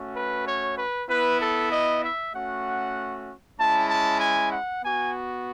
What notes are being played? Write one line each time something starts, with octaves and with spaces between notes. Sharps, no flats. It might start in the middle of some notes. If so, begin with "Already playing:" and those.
Already playing: A3 C#4 F#4
B4
C#5
B4
B3 E4 B4
A4
D#5
E5
A3 C#4 F#4 F#5
G#3 C#4 E4 A5
A5
G#5
F#5
B3 F#4 G#5